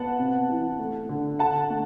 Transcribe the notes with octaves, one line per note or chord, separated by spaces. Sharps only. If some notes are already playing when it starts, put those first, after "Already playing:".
Already playing: B3 F#5 A5
C3
E3
A3
D3
D3 F#5 A5
A3